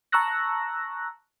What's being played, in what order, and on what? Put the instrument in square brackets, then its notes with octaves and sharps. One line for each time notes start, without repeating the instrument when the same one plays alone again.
[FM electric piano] A5 A#5 C#6 E6 F#6 A#6